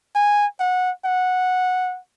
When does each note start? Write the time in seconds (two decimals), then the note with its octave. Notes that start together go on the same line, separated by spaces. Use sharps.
0.15 G#5
0.59 F#5
1.05 F#5